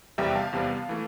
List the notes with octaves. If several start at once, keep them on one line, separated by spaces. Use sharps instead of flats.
E2 C3 G3 B3 E5 G5
F5 A5
E2 C3 G3 B3
E3 A3